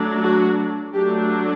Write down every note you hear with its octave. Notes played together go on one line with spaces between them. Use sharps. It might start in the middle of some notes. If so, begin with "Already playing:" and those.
Already playing: F#3 A3 D4
F#4
F#3 A3 D4 G4